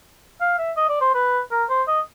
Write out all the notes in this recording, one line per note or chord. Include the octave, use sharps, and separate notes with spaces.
F5
E5
D#5
D5
C5
B4
A#4
C5
D#5